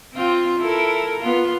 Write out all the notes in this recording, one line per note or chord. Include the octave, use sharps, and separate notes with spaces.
C4 F4
E4 A4 A#4
B3 F4